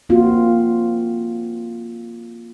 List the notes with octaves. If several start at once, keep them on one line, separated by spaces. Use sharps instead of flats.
A#3 C4 F4 F#4